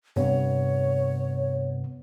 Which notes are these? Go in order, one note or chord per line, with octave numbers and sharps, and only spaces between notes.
G2 C3 B3 C#5